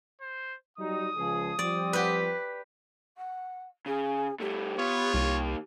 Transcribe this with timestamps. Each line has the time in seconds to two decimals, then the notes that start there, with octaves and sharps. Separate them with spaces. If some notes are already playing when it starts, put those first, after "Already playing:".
0.21 C5
0.78 F#3 G3 D#4 D#6
1.16 C#2 F3 G#4
1.59 F3 G3 C4 D5
1.93 G4 B4
3.17 F#5
3.86 C#3 G#4
4.40 G2 A3 G4
4.78 B3 F4 C#5
5.14 C2 D#3 A#3